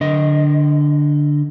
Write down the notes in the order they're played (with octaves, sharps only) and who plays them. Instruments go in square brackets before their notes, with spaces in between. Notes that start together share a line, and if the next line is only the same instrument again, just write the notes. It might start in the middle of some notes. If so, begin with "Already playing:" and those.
[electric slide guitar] D3 D#5